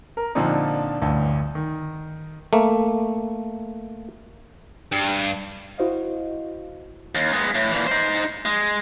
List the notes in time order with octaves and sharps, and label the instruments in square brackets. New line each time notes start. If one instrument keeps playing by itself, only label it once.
[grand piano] A#4
A#2 D3 F3 C4 D4 D#4
A1 D2 G2
D#3
[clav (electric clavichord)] A3 A#3
[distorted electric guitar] G2
[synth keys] E4 F#4 C5 D#5 F5
[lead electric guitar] D#2
G#3 B3
A2
A#2 E3
D#4 C5
G#3